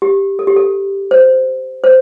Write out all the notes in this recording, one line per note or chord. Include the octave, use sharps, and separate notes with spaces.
G4
A4
G4
A4
C5
C5